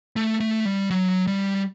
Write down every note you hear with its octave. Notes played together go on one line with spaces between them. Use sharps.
A3
A3
G3
F#3
G3